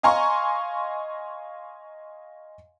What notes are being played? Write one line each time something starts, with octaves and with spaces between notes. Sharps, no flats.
D#5 F5 G#5 A#5 C6 C#6